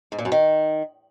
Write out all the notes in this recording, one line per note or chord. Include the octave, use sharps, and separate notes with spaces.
G#2
A#2
F#2
D#3